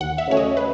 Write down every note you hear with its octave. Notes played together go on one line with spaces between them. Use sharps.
D#2 F#5
E5
C#3 F#3 A3 C#4 C#5
D#5
B4